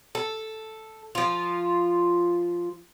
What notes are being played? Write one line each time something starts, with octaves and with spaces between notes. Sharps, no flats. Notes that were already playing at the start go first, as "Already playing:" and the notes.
A4
F3 F4